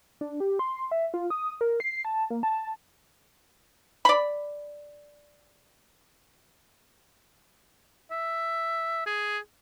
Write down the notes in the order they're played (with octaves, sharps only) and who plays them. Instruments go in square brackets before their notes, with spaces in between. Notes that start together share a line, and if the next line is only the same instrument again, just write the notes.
[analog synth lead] D4
G4
C6
E5
F4
D#6
A#4
C7
A5
A#3
A5
[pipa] D5 B5
[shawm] E5
G#4